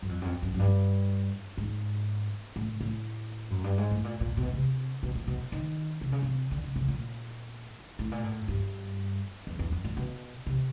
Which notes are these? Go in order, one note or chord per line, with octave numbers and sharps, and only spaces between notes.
F#2
F2
F#2
F2
F#2
F#2
G2
G#2
A2
A2
F#2
G2
G#2
A2
A#2
A#2
B2
C3
B2
A#2
B2
D#3
C3
C#3
C3
D3
C#3
C#3
A#2
A2
A#2
A2
G2
E2
E2
F2
A#2
B2
C3